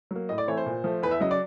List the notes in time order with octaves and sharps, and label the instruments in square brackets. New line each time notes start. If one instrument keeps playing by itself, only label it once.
[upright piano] F#3 A#3
A2 D#5
D5
E3 A3 C4 C#5
C5
A#2
F3 A3
E2 B4
E5
C#3 F#3 D#5
D5